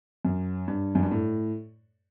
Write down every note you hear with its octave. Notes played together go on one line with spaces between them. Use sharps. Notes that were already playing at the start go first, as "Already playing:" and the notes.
F#2
G2
F#2
G2
A2